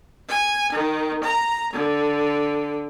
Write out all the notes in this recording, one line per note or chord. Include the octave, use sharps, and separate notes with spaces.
G#5
D#3
A#5
D3